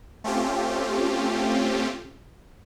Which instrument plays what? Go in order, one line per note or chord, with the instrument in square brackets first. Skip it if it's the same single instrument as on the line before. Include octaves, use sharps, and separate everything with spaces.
[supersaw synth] A3 C4 C#4 F4 G4